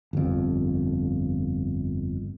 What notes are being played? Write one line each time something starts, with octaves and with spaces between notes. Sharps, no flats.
G1 F2